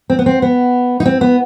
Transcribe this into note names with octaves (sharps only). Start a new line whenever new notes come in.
C4
B3
C4
B3
D#4
C4
B3